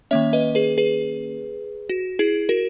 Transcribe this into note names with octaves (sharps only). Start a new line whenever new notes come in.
D#3 A#3 C#4 C#5 E5
B4 D#5
G#4 B4
G#4 B4
F#4
E4 G#4
F#4 A#4